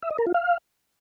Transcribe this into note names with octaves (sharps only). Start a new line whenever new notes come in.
E5
D#5
A#4
F4
F5